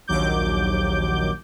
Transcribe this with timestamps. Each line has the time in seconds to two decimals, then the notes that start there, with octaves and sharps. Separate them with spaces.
0.08 A#1 D#2 F#3 D6 G6